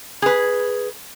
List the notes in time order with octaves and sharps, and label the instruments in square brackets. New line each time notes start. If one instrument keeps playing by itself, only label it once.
[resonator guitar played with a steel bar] G#4 B4